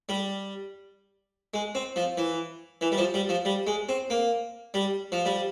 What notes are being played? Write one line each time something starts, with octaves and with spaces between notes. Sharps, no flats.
G3
G#3
C4
F3
E3
E3
G3
F3
G3
F3
G3
G#3
C4
A#3
G3
F3
G3